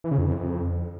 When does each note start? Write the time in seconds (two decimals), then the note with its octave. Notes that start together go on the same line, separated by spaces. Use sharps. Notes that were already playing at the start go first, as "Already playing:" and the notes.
0.04 E3
0.11 C#3
0.18 F2